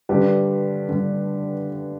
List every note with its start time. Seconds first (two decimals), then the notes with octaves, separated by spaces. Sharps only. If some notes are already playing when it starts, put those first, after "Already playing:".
0.09 G2 D3 G4 B4
0.89 G2 D3